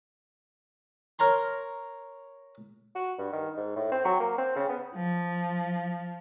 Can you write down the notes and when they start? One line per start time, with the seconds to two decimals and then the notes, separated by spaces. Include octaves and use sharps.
1.19 A#4 C#5 A#5 C6
2.96 F#4
3.19 G2
3.33 D#3
3.57 G#2
3.76 A2
3.92 C4
4.05 F#3
4.20 A#3
4.38 C4
4.56 C#3
4.69 B3
4.95 F3